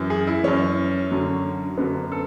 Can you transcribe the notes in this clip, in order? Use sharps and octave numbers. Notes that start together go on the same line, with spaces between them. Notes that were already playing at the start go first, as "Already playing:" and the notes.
Already playing: F#2 E3
G#4
E4
F#2 E3 C#4
F#2 D3 F#3
F#2 D3 F#3 B3
A4